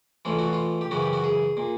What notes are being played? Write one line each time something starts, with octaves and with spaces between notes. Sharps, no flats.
A1 A2 E3 F4
F#4
F4
G4
F#2 C#3 E3 F#4
G4
F#4
G#4
A#2